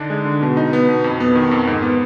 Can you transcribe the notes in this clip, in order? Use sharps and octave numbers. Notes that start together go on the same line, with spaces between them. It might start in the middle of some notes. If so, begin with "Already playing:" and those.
Already playing: D3 D4 D#4
G#3
D3
B2
D#4
B3
B2
F2
B3
D#3
F2
G#2
B3